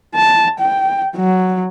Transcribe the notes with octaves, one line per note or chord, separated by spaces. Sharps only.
A5
G5
F#3